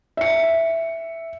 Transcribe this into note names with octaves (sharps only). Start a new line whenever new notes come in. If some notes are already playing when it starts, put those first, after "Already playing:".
E5 C#7